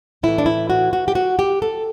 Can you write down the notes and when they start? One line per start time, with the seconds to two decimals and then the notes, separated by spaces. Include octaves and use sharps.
0.23 A2 E3 E4
0.38 D4
0.46 E4
0.70 F#4
0.93 F#4
1.08 G4
1.15 F#4
1.39 G4
1.62 A4